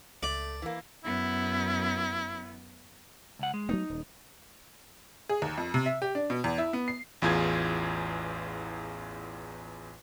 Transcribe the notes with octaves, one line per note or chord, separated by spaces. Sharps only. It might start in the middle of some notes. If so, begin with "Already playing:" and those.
C#2 A3 D5
E3 A#3
F#2 B3 E4
C#2 F#5
G#3
F#3 A3 B3 D#4
D#1
G#4
D#2
F2
C3
E5
G4
D4
B2
E2
E4
B3
C7
A1 E2 F4 G#4 G#6